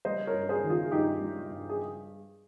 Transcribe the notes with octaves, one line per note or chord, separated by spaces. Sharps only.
G3 C5 D#5
A#4 C#5
G2
G#4 C5
D#3
F4 G#4
G2 D#4 G4
G3
G2
G#4